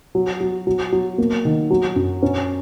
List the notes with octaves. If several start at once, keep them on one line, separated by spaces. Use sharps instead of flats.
F#3
F#3
F#3
F#3
A#3
D#3
F#3
F#2
C#4